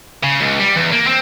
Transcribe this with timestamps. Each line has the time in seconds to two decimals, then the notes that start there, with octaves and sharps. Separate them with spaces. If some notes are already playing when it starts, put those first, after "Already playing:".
0.23 C#3
0.41 C#2
0.59 G3
0.76 E2
0.92 A#3
1.07 C4